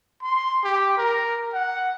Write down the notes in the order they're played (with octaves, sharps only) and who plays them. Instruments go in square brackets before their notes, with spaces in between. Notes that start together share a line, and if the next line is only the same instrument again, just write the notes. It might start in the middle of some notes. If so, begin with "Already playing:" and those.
[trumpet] C6
G4
A#4
F#5